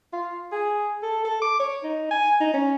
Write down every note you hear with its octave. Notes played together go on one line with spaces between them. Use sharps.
F4
G#4
A4
A4
D6
C#5
D#4
G#5
D#4
C#4